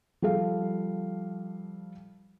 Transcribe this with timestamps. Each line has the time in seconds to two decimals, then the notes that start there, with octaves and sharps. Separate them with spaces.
0.22 F3 G3 A4 F5